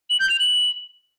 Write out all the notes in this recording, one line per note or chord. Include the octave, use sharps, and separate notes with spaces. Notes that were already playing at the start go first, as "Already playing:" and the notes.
F#7
G6
F7
F#7